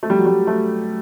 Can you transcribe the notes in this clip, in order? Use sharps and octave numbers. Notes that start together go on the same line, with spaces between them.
A3
G3
F#3
G3
A3